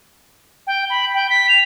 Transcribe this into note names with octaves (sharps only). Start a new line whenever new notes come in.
G5
B5
G5
B6
F7